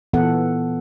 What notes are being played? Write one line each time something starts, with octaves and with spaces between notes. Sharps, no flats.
A#2 E3 B3 F4 A4 F#5